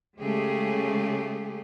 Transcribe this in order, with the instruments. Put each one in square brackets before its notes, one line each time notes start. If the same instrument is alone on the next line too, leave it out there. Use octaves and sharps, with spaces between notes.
[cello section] C#3 G#3 A3 G4 G#4